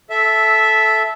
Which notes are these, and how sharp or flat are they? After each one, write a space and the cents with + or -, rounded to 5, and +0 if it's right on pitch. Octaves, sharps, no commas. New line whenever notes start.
A4 -15 E5 +0